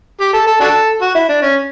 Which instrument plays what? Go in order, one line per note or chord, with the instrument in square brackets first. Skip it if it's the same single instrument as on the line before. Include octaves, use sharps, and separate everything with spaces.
[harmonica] G4
A4
A4
D4 F#4 A4
F#4
E4
D4
C#4